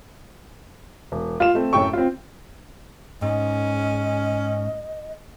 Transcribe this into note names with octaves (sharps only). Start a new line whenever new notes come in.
E1
F4 F5 E7
A3 C4
F#2 A2 A3 G5 C#6
C4 F4
G#2 C#4 D#5